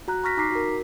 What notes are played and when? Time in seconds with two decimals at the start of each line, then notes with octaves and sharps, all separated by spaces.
0.08 F#4 A#5 F#6
0.24 A#5 C#6 F6 A#6 B6
0.37 D#4 A#5 D6 B6 C7
0.52 F#4 A#4